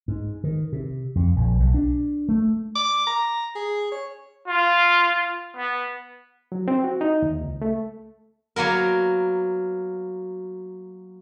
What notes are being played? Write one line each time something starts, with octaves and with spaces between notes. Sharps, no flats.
G#2
D#3
C3
F2
A#1
B1
D4
A3
D6
A#5
G#4
C#5
F4
B3
F#3
C4
F#4
D#4
D#2
C#2
A3
F#3 A#3 B3 A#4